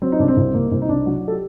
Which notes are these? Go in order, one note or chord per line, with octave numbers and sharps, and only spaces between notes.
F#3 C4
D#4
C2 D4
C4
C2
C2 A#3
C2 C4
D#4
C2 D4
F#3 F#4
A4
G4